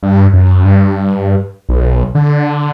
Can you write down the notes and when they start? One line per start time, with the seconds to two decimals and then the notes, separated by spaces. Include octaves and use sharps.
0.03 G2
0.33 F#2
0.65 G2
1.69 B1
2.15 D3